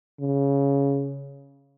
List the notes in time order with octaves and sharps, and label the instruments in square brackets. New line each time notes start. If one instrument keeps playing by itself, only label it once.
[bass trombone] C#3